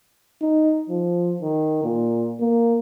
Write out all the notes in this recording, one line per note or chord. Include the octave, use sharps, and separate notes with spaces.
D#4
F3
D#3
A#2
A#3